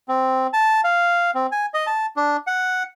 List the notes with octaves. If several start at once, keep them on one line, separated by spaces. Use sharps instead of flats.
C4
A5
F5
C4
G#5
D#5
A5
D4
F#5